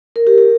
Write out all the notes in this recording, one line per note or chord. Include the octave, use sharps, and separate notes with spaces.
A#4
G4
G4